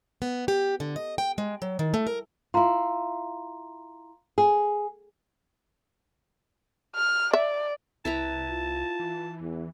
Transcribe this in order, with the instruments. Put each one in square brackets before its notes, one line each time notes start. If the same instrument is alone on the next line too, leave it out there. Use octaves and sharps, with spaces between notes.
[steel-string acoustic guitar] B3
G4
D3
D#5
G5
G#3
F#3
D#3
A3
A#4
[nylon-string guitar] E4 F4 [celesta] F5 A#5 C6
[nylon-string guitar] G#4
[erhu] F6
[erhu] D5 [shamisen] E5
[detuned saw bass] C2 [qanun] E4 B4 A#5 [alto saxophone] A5
[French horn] F4
[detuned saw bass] E3
[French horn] E2